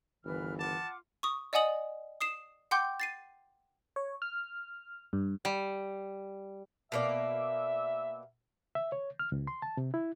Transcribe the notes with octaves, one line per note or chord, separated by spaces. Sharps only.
G1 C2 D#3 E3 B4 F6
F4 F#5 A5 D6
C#6 D#6
D5 D#5 F#5 G#5 D#6 F#7
D#6 C7 E7
F#5 G5 C6 D6 G6
A6 C7 D#7
C#5
F6
G2
G3
B2 A#3 D5 E5
E5
C#5
F6
C#2
C6
A5
C3
E4